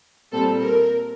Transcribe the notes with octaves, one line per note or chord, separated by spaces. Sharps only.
A#2 G3 C4 A4
A#4